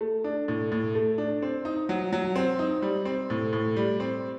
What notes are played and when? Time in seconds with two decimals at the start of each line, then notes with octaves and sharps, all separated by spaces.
0.01 A3
0.24 D4
0.48 A2
0.72 A2
0.95 A3
1.18 D4
1.42 C4
1.65 D#4
1.89 F#3
2.13 F#3
2.36 C4
2.59 D#4
2.82 G3
3.05 C4
3.30 A2
3.53 A2
3.76 G3
4.00 C4